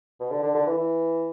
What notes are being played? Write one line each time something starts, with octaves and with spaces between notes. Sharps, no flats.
B2
D3
D3
D3
E3
E3